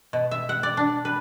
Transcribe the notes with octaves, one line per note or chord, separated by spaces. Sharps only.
B2
E5
F#5
D5
D4
B4